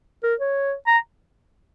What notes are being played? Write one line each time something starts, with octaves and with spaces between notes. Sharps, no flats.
A#4
C#5
A#5